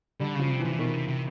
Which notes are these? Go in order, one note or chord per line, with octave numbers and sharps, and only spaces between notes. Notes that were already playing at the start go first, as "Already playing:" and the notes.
D3 G3
C#3 F3
C3
E3
C3
E3
B2 D#3
C3
C3